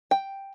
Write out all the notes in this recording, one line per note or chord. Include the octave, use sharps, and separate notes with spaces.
G5